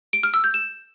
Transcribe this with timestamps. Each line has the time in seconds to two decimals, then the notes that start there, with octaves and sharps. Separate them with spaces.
0.13 D7
0.23 F6
0.34 E6
0.44 G6
0.54 E7